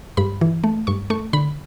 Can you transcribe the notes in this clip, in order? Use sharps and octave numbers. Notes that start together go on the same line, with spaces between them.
G2 B5
E3
A3
G2 C#6
A3 C#6
D3 B5